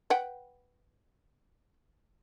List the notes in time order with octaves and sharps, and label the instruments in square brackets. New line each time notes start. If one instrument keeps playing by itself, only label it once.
[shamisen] B4 F#5 G5